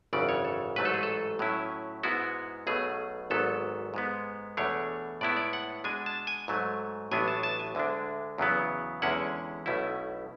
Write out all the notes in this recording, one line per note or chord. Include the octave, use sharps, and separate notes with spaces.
G#1 F#2 C#3 E3 D5
C#5
A4
A1 G#2 F#3 A3 B4
A4
G#4
A4
A2 F#3 C#4 E4
G#2 G#3 B3 E4 F#4
B1 B2 F#3 A3 G#4
G#1 G#2 F#3 B3 A4
G#2 G#3 B3
E2 B2 A3 D4 C#5
A2 G#3 B3 E4 D5
D5
F#5
B2 G#3 D4 G#5
A5
G#5
G#2 F#3 A3
A1 A2 F#3 B3 D4 G#5
A5
A5
G#5
D2 D3 G#3 D4
E2 C#3 F#3 B3 E4
E2 D3 G#3 C#4 E4 F#5
B1 B2 A3 C#4 E4